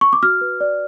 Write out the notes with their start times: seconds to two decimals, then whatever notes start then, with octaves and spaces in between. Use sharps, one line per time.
0.01 C#6
0.13 D6
0.23 F#4 F6
0.41 B4
0.60 D5